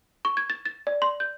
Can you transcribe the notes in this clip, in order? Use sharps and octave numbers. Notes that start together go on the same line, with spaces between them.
C#6
G#6
A6
A6
D5
C6
G6